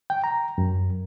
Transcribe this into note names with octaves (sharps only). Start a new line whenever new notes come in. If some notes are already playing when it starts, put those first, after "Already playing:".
G5
A#5
F#2